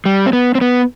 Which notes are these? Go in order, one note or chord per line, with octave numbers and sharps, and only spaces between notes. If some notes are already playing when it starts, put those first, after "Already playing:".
G3
C4
B3
C4
B3